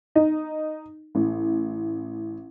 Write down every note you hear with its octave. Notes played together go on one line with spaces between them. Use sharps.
D#4
A1